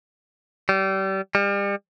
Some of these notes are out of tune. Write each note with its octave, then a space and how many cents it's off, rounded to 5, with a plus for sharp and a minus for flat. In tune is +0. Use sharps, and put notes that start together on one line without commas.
G3 -30
G3 +35